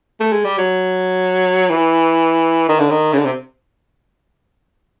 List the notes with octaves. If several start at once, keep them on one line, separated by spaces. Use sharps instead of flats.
A3
G#3
G3
F#3
E3
D#3
D3
D#3
C#3
D3
C3